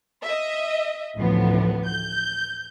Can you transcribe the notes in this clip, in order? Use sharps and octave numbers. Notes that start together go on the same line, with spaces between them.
D#5 E5
A1 D2 A2 F3 B3
G6